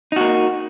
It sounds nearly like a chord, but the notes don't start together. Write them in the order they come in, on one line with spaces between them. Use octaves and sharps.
D#4 F#4 A#3